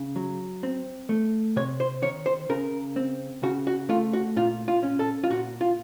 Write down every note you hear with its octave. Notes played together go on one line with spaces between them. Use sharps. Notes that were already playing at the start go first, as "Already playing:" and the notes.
Already playing: C#3
F#3
C4
A3
C3 C#5
C5
D#3 C#5
C5
C#3 A#4
C4
C#3 F#4
F#4
A3 F4
F#4
A#2 F4
F4
C#4
A4
F4
A#2 F#4
F4